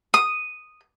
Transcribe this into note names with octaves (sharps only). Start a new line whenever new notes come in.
D#6